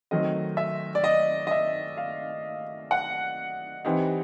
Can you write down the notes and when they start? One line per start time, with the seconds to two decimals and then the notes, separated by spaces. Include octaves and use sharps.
0.11 D#3 F#3 A3 C4 D#5
0.57 E5
0.95 D5
1.04 D#5
1.47 D#5
1.51 E5
1.97 F5
2.91 F#5
3.85 E3 G3 C4 D#4